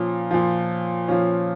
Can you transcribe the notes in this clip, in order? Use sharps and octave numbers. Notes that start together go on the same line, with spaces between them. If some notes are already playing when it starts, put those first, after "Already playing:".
Already playing: A#2 F3 C#4
A#2 F3
A#2 F3 C#4